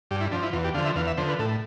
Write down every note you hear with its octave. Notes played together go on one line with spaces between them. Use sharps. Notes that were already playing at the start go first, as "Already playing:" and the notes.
G2 G4
E4
F3 D4
E4
E2 F4
G4
D3 F3 F5
E5
E2 F5
E5
D3 F3 C5
B4
A2 A4